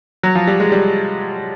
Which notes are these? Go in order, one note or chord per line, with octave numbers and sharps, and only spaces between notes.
F#3
F3
G3
G#3
G3